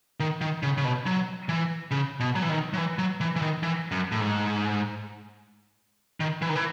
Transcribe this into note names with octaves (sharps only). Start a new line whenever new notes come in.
D#3
D#3
C#3
C#3
B2
F#3
E3
C#3
B2
F#3
E3
D#3
F#3
E3
F#3
E3
E3
D#3
E3
F#2
A2
G#2
D#3
E3
D#3
E3